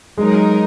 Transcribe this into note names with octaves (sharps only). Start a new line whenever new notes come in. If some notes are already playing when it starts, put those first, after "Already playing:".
F#3 G#3 D#4 A#4